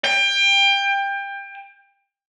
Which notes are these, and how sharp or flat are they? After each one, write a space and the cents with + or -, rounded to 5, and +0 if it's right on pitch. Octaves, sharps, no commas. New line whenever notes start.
G5 +25